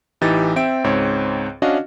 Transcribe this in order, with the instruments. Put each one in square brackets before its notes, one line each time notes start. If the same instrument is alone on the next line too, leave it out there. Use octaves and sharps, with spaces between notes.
[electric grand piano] A1 E3 D#4 G4 A6
C4 E5 G5 D7
C#2 G#2 C4 C#5
C#4 D4 F#4 D#5 F5